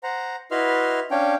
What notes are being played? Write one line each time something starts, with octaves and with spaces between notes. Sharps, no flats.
C5 F#5 A#5
E4 F#4 B4 D#5 C6 F6
C#4 D4 C#5 F5 G5